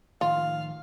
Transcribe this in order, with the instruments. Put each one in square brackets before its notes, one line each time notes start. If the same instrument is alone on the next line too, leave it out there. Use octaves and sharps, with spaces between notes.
[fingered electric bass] A2 D#3 F3 [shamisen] F4 [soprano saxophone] F5